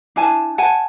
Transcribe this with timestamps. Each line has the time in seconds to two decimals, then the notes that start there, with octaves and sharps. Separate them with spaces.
0.16 D4 E4 G#5 A5
0.58 F#5 G#5 A5